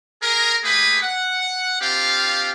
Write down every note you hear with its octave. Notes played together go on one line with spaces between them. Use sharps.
G#4 A#4
A3 A#3 G4 G#4 B4 B5
F#5
C4 D4 F4 G4 F5